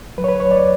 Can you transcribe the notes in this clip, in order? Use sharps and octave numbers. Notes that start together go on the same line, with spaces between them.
F#3 B4
C#5
B4
D2
C#5
D5